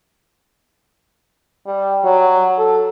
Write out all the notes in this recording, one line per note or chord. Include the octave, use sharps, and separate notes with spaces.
G3
F#3
A4